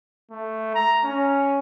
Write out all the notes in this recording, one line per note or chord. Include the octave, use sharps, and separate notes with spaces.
A3
A#5
C#4